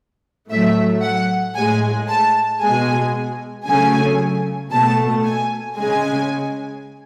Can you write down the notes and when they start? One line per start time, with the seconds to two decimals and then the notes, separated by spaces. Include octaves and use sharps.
0.50 A2 F#3 A3 E5
1.02 F#5
1.55 A2 G#3 G#5
2.08 A5
2.61 B2 G#3 G#5
3.66 C#3 F#3 A3 G#5
4.71 B2 A3 A5
5.24 G#5
5.77 C#3 G#3 G#5